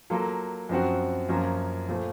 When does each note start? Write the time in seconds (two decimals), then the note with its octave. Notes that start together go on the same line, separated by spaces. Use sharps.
0.10 F#3 A#3 F4 A4
0.69 F#2 F3 C4 F#4
1.29 F#2 F3 A#3 C#4 F4
1.88 A#2 F3 A3